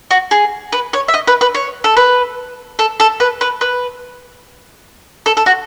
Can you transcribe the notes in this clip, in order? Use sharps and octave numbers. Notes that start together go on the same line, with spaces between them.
F#4
G#4
B4
C#5
E5
D#5
B4
B4
C#5
A4
B4
A4
A4
B4
B4
B4
A4
A4
F#4